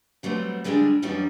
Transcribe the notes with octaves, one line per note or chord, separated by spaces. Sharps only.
F#3 G3 A3 B3 C4
D3 G3 G#3 D4 G4 G#4
F#2 D#3 E3 G3 C#4 D4